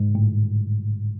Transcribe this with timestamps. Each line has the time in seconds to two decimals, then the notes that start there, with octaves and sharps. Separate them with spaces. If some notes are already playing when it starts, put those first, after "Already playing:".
Already playing: G#2
0.15 A2